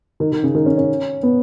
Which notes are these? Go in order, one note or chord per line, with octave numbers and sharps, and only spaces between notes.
D#3
D#3
C#3
D#3
C#4
C#4
B3